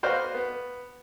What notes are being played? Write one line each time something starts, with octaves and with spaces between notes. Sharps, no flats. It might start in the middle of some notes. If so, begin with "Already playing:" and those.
F#4 B4 C5 D5 D#5 F5
B3